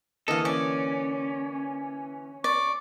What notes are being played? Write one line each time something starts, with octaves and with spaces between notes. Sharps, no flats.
D3 E3 A#3 A4 D#5 F5
C#4 D5
D5 C#6